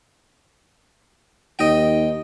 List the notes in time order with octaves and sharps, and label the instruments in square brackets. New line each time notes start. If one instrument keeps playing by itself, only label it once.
[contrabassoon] D#2 [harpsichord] D#5 G5